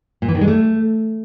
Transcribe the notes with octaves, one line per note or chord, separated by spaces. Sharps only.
A#2
E3
D#3
G#3
A3